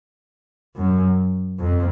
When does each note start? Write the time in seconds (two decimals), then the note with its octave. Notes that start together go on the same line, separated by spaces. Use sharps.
0.76 F#2
1.59 F2